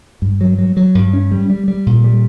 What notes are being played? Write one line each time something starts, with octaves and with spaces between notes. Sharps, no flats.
G2
F#3
F#3
F#3
G2
C#4
G3
G3
G3
A#2
G3